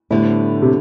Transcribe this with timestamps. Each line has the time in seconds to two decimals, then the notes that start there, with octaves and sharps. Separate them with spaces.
0.11 A2 D3 G3 B3 E4
0.62 C3